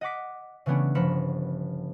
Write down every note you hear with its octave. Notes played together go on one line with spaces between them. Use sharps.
D#5 F#5 D6 B6
C#3 E3 A3 B3 C#4 D4
G1 F3 A#4 B5 C#7 E7